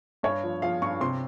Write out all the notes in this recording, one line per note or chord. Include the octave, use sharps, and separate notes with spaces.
G2 C#5
F3
F3 F5
G2 C#6
C3 C6